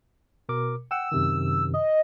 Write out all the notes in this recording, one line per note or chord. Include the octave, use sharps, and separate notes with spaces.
B2 A#4 D6
F#5 G5 E6
F#2 C3 D#3
D#5